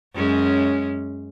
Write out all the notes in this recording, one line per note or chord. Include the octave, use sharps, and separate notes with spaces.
F#2 G#3 C#4